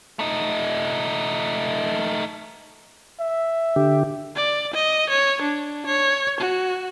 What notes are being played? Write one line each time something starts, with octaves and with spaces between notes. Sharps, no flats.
A3 D#4
E5
D3 G4
D5
D#5
C#5
D4
C#5
F#4